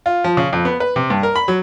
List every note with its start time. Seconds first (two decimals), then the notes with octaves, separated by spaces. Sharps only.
0.06 F4
0.24 F3
0.37 C#3
0.53 F2
0.65 B3
0.80 B4
0.96 C3
1.10 G2
1.23 A#4
1.36 B5
1.48 F#3